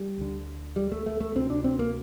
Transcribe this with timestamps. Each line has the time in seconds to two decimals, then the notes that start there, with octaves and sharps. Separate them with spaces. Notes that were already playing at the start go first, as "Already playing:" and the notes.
Already playing: G3
0.18 D2 D3
0.76 G3
0.92 A3
1.06 A3
1.20 A3
1.35 D2 C3 C4
1.50 D4
1.64 C4
1.79 A#3